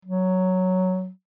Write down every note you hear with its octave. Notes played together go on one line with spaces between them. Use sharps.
F#3